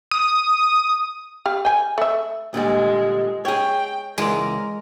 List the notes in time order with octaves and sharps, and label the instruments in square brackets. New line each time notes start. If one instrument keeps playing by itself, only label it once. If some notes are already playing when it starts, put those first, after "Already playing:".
[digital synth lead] D#6
[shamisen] G4 F5
G5 G#5
A3 E5
[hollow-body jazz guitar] A#2 D3 G3 [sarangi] G#3
[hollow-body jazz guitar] G#4 C#5 [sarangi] G5
[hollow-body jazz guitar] C#2 E3 D5 [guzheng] G#3 [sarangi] A#4